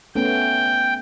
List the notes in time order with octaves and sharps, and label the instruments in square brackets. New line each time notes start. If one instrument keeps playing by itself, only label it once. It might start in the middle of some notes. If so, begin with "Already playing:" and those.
[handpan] A3 B3 C#4 [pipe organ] G5